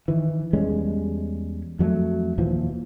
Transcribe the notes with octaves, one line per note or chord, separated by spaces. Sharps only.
D#3 E3
E2 G3 G#3 C#4
F2 F#3 G#3 A3
D#2 A#2 E3 F3